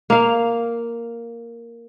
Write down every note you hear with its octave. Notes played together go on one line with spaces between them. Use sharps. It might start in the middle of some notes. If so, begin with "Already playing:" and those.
A#3 F5